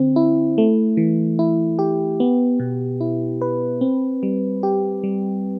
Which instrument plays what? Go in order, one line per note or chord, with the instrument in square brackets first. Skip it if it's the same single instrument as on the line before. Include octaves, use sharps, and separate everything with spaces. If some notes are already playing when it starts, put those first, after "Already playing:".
Already playing: [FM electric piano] D3 C4
E4
A3
E3
E4
G4
B3
B2
E4
B4
C4
G3
G4
G3